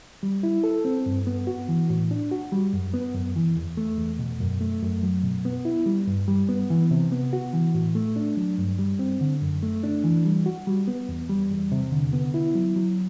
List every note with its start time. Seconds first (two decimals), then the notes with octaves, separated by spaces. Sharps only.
0.23 G3
0.43 E4
0.64 A4
0.85 C4
1.06 G2
1.27 B3
1.47 F#4
1.69 E3
1.90 A2
2.11 D4
2.31 F#4
2.52 G3
2.73 F#2
2.94 B3
3.15 F#2
3.36 E3
3.57 E2
3.77 A3
3.98 E2
4.19 B2
4.40 F#2
4.61 A3
4.82 F#2
5.03 F#3
5.23 B2
5.45 B3
5.65 E4
5.86 G3
6.07 G2
6.28 G3
6.49 B3
6.70 E3
6.91 C3
7.12 B3
7.33 F#4
7.53 E3
7.74 A2
7.95 A3
8.16 D4
8.37 F#3
8.58 G2
8.79 G3
8.99 C4
9.21 D3
9.42 F#2
9.63 A3
9.83 D4
10.04 E3
10.25 G3
10.46 F#4
10.67 G3
10.88 B3
11.09 E2
11.30 G3
11.51 E2
11.72 C3
11.92 D3
12.13 B3
12.34 E4
12.55 F#3
12.76 F#3